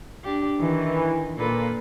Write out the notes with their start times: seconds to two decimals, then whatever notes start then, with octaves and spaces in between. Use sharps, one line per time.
0.24 D4 G4
0.60 D#3 E3
1.37 A#2 A#3 A4 B4